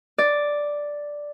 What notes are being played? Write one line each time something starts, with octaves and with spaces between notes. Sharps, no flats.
D5